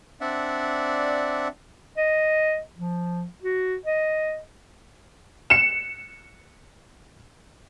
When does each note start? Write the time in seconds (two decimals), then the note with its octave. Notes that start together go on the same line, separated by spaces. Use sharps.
0.21 C4 D4 D5 E5 F#5
1.97 D#5
2.76 F3
3.42 F#4
3.86 D#5
5.50 C#7 E7